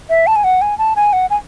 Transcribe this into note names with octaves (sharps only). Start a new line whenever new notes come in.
E5
A5
G#5
F#5
G#5
A5
G#5
F#5
G#5